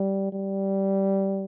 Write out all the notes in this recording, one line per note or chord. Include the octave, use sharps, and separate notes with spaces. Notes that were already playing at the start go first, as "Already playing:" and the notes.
Already playing: G3
G3